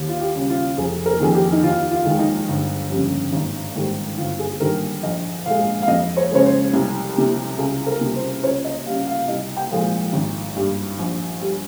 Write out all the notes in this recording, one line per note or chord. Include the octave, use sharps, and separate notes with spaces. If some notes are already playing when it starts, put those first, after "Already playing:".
Already playing: D#2
F4
G4
C#3 G3
F4
F1 G#4
A#4
F2 D#3 G#4
G4
D#4
D#2 F4
F4
D#3 G#3
D#4
G1
F2 C#3 G3
G#1
G#2 D#3 G3
G1 F4
G#4
G2 D#3 G3 A#4
A#1 D#5
A#2 G#3 F5
F5
F2 D#5
C#5
C#3 G#3 C#5
C5
C2
C3 G3
C#2 G#4
A#4
C3 G3
C5
C#2 C#5
D#5
C#3 G3 F5
F5
C2 D#5
G5
A#2 F3 G#3
G#1
G2 G3
A#1
G3